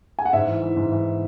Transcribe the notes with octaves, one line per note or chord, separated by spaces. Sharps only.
G#5
F#5
G#2 E5
E3
E3
G#2
E3